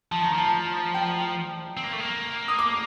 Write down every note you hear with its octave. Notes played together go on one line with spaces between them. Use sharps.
F3 A5
D#3 A#5
F3
A5
G5
C4
A#3
A3
A#3
D#6
D6